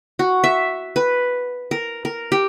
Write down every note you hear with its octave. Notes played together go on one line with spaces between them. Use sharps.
F#4
E5
B4
A#4
A#4
G4